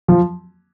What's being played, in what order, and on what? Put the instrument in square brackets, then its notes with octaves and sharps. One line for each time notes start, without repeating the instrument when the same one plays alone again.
[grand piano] F3